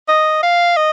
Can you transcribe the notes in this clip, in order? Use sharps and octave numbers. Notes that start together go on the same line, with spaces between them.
D#5
F5
D#5